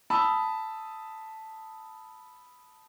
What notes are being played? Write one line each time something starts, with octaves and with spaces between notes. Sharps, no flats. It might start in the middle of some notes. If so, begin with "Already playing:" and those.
A5 B5 D#6 E6